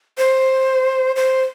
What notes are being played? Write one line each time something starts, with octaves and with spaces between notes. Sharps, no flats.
C5
C5